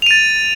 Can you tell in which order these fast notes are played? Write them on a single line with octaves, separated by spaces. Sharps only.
F7 D#7 A6